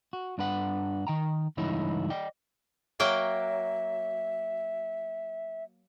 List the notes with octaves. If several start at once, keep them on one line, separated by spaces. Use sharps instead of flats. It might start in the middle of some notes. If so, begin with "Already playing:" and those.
F#4
G2 D4 B4 F#5
D#3 G5 A#5
C#2 G2 E3 D#4 E4 C#5
D5 D#5 G5
F#3 A#3 E5 G5